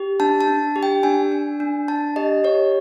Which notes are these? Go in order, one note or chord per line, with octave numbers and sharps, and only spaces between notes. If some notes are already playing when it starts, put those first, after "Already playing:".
Already playing: G4
D4 A5
A5
D4
G4
G5
D4 G#5
D4
D4
D4 A5
G4 D#5
G4 C#5